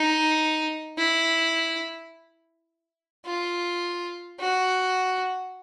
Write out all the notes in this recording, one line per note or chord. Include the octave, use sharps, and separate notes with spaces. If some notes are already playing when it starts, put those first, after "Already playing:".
Already playing: D#4
E4
F4
F#4